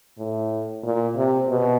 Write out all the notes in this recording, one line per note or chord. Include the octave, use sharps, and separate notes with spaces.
A2
A#2
C3
B2